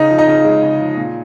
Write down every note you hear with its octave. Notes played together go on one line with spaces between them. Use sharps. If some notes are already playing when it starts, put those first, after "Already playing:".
Already playing: C#3 D#4 D#5
F3
D#4 D#5
C#3
G#3
C#3
F3
A#2